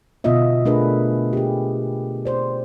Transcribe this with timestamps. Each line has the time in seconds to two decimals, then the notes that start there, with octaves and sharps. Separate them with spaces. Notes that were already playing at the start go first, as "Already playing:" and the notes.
0.24 B2 D3 B3 F4 D#5 E5
0.65 A3 D4 G#4 A#4 B4
1.33 G4 G#4
2.25 C5 D5